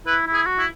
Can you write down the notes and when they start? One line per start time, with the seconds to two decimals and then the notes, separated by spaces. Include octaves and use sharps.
0.07 E4 B4
0.27 E4
0.33 G#4
0.46 F#4
0.59 E4